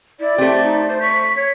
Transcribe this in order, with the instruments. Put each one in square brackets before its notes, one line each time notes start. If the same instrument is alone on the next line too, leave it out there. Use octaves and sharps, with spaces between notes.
[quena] E4 [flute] D5
[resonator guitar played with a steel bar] A3 C4 [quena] G4
[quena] D#4
C5
[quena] C#6 [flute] B6
[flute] C#5